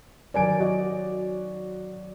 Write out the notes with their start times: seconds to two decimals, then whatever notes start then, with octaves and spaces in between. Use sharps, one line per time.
0.34 D#3 F#3 A#4 D5 G#5 D7
0.60 F#4 D#5